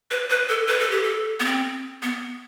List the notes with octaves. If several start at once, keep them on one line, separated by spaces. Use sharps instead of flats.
B4
B4
A4
B4
A4
G4
A4
B3
C4
B3